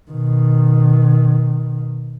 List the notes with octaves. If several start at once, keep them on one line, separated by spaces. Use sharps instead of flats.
B2 D#3